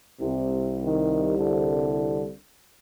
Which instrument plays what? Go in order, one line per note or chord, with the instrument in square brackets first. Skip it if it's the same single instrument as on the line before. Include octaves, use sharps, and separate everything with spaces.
[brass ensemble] C2 [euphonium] C3
[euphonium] D#3
D3